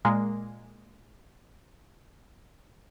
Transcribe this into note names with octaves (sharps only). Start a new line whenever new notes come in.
A#2 G#3 A#3